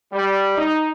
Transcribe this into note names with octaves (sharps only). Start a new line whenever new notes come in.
G3
D#4